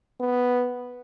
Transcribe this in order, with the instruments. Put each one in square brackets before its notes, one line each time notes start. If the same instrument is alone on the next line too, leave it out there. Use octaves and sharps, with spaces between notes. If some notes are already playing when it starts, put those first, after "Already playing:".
[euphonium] B3